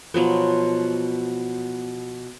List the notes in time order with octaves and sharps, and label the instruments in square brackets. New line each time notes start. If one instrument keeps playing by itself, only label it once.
[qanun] B2 F3 F#3 B3